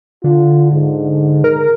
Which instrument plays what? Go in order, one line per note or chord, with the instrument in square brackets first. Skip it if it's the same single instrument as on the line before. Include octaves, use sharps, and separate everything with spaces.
[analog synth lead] D3 [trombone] F4
[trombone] G#2
[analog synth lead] A#4